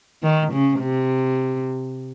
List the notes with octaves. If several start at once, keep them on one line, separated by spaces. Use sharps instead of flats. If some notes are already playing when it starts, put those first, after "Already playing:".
D#3
C#3
C3